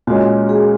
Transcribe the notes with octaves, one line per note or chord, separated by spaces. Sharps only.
A#2 G#3 C#4 F#4
G#4